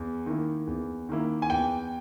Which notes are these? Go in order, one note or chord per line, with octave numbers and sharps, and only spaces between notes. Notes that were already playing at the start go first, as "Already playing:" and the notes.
Already playing: E2
D#3 A#3 E4
E2
D#3 A#3 E4
G#5
E2 G5